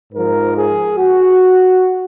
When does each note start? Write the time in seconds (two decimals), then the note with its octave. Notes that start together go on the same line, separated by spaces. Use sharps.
0.13 G#2 F3 A#4
0.56 G#4
0.98 F#4